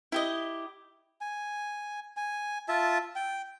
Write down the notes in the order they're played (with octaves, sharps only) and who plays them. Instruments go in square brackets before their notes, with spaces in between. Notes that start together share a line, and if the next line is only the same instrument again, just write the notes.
[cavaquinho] E4 G4 D#5
[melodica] G#5
G#5
F4 E5 A5
G5